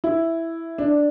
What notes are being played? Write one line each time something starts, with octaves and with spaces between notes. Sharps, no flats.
E4
D4